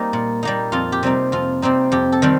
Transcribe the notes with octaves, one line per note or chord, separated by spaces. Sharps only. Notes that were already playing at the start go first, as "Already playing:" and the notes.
Already playing: G3 A#3 D#4 C5
A#2
G3 A#3 D#4
F2 F4
G4
C3 G3 C4 D#4
F2 F4
C3 G3 C4 D#4
F2 G4
A4
D#3 G3 C4